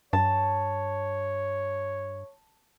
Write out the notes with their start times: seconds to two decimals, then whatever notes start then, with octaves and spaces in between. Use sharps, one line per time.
0.13 G2 C#5 A5